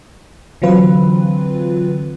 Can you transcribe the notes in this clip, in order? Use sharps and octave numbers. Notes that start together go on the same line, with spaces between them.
D3 E3 F#3 C4 F4 B4